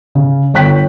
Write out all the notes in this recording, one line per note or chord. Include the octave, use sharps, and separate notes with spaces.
C#3
G1 C#5 G5 F#6 B6